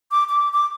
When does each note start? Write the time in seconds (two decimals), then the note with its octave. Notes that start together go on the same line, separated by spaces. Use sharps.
0.11 D6
0.29 D6
0.53 D6